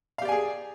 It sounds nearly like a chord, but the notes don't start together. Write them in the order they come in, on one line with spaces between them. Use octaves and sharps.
F5 G4 D5 G#5 G#4